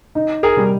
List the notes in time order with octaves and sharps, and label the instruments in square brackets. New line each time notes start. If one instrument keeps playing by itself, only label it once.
[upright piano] D#4
[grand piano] G#4 A#4
[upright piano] G3